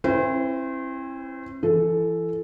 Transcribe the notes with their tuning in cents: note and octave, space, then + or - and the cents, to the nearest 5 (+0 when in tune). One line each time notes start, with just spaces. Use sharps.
C4 +40 E4 +10 C5 -35
E3 +35 A4 +0